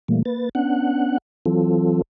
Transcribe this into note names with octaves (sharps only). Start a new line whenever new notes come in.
A#2 E3 G3 A3 A#3
A#3 B4 A6
B3 C#4 D4 F#5 F#6
E3 F#3 C4 F4 A4